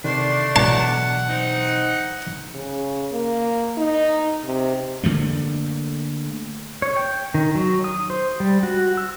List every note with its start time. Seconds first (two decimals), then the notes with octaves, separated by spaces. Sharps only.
0.04 C3 D#3 A3 D4 C6
0.56 B2 E3 F#3 F#5 A5
1.28 C4 D#4
2.55 C#3
3.12 A#3
3.77 D#4
4.45 C3
5.04 D3 F3 A3 A#3
6.82 C#5
6.96 G5
7.34 D#3
7.55 F#3
7.84 D#6
8.10 C5
8.40 G3
8.63 F#4
8.97 E6